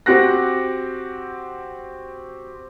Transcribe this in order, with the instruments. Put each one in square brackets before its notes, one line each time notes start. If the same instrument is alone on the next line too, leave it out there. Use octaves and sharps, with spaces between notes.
[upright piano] C4 F#4 G4 F#5 F#6 A#6